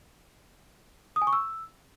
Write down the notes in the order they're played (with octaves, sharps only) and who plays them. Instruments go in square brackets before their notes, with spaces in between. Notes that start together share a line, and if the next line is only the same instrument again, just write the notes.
[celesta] D#6
G#5
C#6
E6